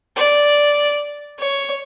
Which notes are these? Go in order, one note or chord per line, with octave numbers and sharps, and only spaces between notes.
D5
C#5